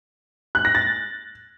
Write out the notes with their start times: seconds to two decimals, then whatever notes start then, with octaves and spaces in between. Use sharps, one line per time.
0.55 F#6
0.65 A#6
0.75 A6